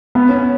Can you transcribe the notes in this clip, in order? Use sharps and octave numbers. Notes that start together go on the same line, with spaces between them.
B3
C#4